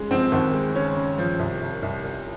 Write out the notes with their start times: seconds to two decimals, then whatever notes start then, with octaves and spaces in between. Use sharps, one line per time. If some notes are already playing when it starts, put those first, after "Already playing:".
Already playing: C#3 G#3
0.11 F3 C4
0.32 D#2
0.54 G#3
0.75 C#3 C#4
0.97 C#3
1.18 F3
1.39 C2
1.61 C2
1.83 C2
2.04 C2